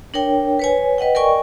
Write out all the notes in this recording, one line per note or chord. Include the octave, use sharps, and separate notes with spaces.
D4 A#4 C#5 G5
B4 C#5 G#5
B4 D#5 F#5 G5
A#4 D5 D#5 G5 G#5 C#6